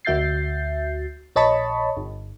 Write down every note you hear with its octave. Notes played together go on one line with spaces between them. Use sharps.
D2 F#4 E5 G6 A6 C7
A#1 C#5 D#5 A5 B5 C#6
G1